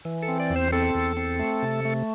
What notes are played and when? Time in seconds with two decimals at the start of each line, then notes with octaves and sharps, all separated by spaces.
0.05 E3
0.23 A4
0.28 C4
0.40 D5
0.50 E2
0.56 C5
0.72 C4 A4
0.95 E2
1.17 C4
1.39 A3
1.62 C3
1.85 A3